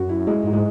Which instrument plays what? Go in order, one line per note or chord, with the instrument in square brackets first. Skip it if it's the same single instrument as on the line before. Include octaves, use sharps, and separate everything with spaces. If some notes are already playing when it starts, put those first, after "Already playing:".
Already playing: [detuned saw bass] F#2 [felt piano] F#4
[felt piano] E4
G#3
[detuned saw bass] G#2
[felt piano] G#3